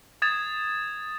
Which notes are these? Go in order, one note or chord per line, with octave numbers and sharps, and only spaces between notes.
D#6 G#6 A6 E7